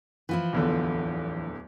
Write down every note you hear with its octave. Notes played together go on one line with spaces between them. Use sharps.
E3 F3 E4
D1 E2 D3